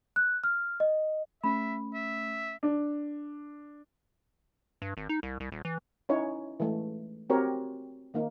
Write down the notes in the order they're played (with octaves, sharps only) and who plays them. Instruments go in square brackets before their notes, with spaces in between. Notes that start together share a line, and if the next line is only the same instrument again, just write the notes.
[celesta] F#6
F6
D#5
[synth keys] A3 C#4 [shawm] E5 [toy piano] B5
[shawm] E5
[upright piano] D4
[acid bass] G2
G#1
D#4
C2
C2
D#1
E3
[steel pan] C#4 D#4 E4 C#5
E3 G#3 A3
C4 F#4 G4 A#4 C#5
D#3 A#3 D#4